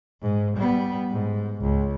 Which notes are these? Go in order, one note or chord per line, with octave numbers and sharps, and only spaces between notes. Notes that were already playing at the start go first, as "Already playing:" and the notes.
G#2
G3 B3
G#2
C#2